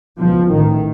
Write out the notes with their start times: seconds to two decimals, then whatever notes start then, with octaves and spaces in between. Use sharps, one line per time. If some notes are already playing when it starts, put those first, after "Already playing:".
0.17 C#2 B2 F3
0.49 A1 A2 D#3